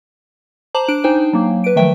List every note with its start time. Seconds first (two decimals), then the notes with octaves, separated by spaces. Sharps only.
0.75 C5 A5 A#5 D6 F#7
0.88 D4 A5 D7
1.04 D#4 C5 G5 G#5
1.33 F#3 A#3
1.64 B4 D7
1.76 D#3 F3 F#3 A3 E5 G5